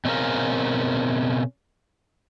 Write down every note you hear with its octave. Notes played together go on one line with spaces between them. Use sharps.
B2 C4 C#4 G#4 A#4 F5